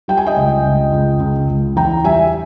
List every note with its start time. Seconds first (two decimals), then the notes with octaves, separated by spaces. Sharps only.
0.08 G3 G5
0.17 G#5
0.27 D#5 G5
0.36 C#2
0.64 C#2
0.92 C#2
1.20 C#2
1.49 C#2
1.76 E2 G5 A#5
2.04 G3 E5 G#5